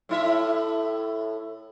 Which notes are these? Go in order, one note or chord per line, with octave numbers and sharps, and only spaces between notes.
A2 E4 E5